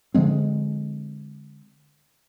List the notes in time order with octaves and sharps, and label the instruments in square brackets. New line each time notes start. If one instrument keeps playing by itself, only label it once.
[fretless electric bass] D3 F3 G#3 C4